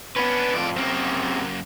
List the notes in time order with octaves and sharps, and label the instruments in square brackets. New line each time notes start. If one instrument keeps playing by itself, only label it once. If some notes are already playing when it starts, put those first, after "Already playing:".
[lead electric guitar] B3 B4 [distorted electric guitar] C#4 D4
[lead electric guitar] F2 [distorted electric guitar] A2 D5
[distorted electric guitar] F#2 A#3 [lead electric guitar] C#3 C4